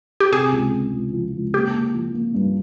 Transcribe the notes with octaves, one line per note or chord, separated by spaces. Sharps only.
G4
C3 G#4
C#2
C3
C#2
F3
C#2
A#3 G4
A#3
F3
A#3
G2